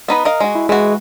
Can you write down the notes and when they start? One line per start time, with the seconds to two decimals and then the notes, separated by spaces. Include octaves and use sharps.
0.08 B3 D#4 B4
0.25 A#4 D#5 F5
0.40 G#3 F#4
0.55 E4
0.69 E3 G#3 F#4